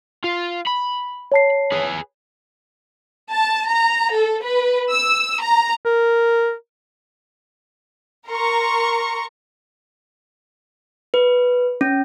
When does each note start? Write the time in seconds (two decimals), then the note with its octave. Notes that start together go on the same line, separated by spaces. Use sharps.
0.24 F4
0.66 B5
1.32 C#5 A5 C7
1.72 G#4 B4
3.34 A5
3.71 A#5
4.14 A4
4.44 B4
4.91 E6
5.40 A#5
5.85 A#4
8.28 A#4 A#5 C6 C#6
11.14 B4
11.81 C#4